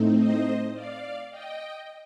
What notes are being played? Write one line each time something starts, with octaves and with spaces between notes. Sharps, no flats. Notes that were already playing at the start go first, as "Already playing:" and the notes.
Already playing: A2 A3 C4 D#4
C5 D#5
D5 F5
D#5 G5